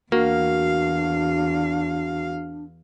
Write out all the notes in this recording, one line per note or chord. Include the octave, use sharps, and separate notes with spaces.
E2 A#3 D4 F#4 F5